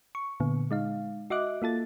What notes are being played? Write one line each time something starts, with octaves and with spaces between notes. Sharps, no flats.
C#6
A#2 D3 B3
G#3 D#4 F5
F#4 D#5 E5 D6 F#6
A#3 F4 A4 A6